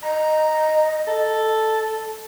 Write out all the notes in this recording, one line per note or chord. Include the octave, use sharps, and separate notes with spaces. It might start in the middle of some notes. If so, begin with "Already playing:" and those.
D#5 A#5
A4